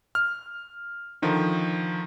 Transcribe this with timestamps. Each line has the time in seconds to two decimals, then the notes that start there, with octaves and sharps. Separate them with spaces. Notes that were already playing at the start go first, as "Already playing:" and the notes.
0.15 F6
1.22 D3 D#3 F3